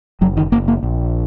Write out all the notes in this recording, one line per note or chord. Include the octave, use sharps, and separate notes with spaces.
F#1 F#3
D#3
F#1 A#3
A#3
A#1